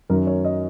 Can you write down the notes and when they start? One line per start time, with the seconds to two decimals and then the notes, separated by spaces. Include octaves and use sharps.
0.09 F#2 D#3 F#3 C#4 A#4
0.27 C#5
0.45 D#5